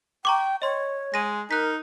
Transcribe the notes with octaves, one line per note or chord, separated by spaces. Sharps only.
G5 A#5 C#6 D6
C#5 D#5 C6
G#3 A#6 D#7
D#4 A#4 F#6 B6